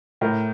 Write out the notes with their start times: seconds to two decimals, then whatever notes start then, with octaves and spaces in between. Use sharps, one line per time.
0.21 A2 A#4